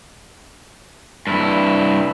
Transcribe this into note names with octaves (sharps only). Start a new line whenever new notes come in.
G2 E4